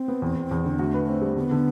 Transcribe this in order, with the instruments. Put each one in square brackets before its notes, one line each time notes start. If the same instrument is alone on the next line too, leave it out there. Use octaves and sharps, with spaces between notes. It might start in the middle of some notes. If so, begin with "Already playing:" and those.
Already playing: [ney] C4
[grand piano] B3
E2
E2
E2
D3
[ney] A3 [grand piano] F#4
[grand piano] B4
C4
G3
[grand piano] D3 [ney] B3
[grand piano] D3